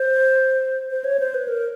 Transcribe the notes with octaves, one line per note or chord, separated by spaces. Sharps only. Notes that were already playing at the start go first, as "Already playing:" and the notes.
Already playing: C5
C5
C#5
C5
B4
A#4